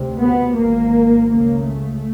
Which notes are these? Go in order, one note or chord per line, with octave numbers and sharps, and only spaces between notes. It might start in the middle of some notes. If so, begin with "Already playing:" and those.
Already playing: D2 C3
B3
G#1 G#2 A#3
C#2 C#3 A#3
A3